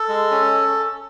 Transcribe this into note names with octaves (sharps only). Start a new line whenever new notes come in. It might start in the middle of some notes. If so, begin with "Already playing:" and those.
Already playing: A4
G#3
C#4